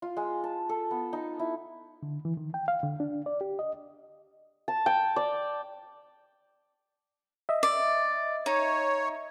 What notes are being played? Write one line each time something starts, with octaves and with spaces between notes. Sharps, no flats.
F4
G#3
A5
A4
B3
D#4
E4
D3
E3
D#3
G5
F5
D3
D4
D5
G4
D#5
A5
G5
D5
D#5 E5
D5
D#4 C#5